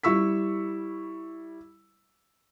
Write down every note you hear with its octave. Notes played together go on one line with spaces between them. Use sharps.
G3 E4 C#6 E6 B6